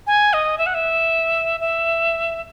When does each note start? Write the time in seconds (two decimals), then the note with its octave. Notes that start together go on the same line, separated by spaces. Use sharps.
0.07 G#5
0.33 D#5
0.58 E5
0.66 F#5
0.74 E5
1.60 E5